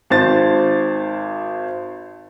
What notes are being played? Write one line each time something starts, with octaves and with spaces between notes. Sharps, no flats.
G#1 C5 A5 A6